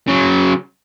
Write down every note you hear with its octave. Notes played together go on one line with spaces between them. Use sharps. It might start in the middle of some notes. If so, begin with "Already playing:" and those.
C#3 F#3